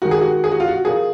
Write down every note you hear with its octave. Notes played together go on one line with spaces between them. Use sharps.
D#3 G#3 F#4
G#4
F#4
G#4
F#4
F4
F#4
A#2 F3 A#3 G#4